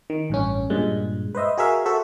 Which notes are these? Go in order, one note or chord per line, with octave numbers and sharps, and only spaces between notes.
D#3
A1 G2 C#4
G2 A#2 G#3
B4 C5 D#5 E5
F#4 G#4 A#4 E5 F5
F#4 A4 C5 E5